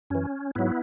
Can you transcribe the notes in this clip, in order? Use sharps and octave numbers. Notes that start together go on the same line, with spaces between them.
F#2 E3 C#4
G#2 F#3 B3 E4